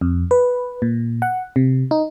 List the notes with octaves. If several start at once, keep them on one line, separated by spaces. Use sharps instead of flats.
F2
B4
A#2
F#5
C3
D#4